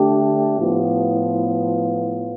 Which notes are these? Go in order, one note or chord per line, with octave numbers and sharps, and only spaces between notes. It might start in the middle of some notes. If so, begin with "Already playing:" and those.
Already playing: D3 A3 D4 G4
A2 F3 B3 F4